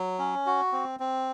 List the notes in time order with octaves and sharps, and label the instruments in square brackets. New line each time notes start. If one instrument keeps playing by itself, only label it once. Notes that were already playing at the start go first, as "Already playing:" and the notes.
Already playing: [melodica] F#3
C#4
F#4
C4
C4